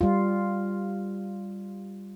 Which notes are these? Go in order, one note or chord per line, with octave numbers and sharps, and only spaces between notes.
G3 F4